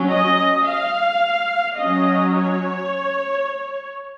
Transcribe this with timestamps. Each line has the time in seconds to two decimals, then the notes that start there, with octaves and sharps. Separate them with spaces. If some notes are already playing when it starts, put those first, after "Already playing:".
Already playing: F#3 C#4
0.12 D#5
0.68 F5
1.80 F#3 C#4 D#5
2.36 C#5